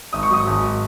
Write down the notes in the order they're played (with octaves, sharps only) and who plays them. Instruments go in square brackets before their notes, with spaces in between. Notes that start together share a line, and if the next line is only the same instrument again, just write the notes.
[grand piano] G#1 D#6
C#6
F#3 D#6
G#1